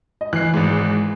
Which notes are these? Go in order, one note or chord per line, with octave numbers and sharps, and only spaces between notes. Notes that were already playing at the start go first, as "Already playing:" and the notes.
D#5
E3 F#6 C7
G#1 G#2